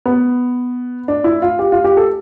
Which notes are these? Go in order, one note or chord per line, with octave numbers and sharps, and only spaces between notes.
B3
D4
E4
F4
G4
F4
G4
A4